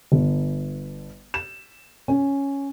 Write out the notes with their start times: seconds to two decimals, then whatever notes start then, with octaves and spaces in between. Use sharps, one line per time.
0.12 G1
1.34 E7
2.08 C#4